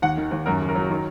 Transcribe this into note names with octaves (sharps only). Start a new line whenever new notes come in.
D#2 F#5
D#3
D#2
F#2 A#4
F#1
A#4
F#3
D#3